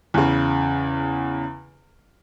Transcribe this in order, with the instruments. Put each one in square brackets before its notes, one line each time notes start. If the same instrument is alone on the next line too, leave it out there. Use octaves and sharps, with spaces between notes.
[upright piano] E2 C#3